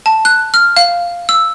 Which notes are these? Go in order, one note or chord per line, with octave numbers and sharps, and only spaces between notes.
A5
F#6
F6
F5
E6